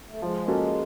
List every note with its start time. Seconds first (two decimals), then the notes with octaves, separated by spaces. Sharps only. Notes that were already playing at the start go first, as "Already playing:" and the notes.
0.09 A3
0.22 F3 G#3
0.47 A#3 C#4 F#4 A4